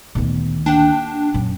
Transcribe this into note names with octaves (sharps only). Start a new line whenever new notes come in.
D2 A#2 D#3 B3
A#3 D4 G4 F#5 G5
F#2 A#2